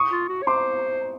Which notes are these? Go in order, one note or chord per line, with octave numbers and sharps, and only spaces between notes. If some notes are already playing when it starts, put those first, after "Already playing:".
Already playing: C#6 D#6
F4
F#4
C#5
C5 C6 D6